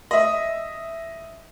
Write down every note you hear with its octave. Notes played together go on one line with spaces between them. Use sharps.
D#5 E5